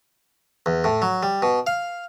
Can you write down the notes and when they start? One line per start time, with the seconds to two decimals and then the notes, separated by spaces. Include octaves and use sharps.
0.66 E2
0.84 A2
1.02 F#3
1.23 G3
1.42 B2
1.67 F5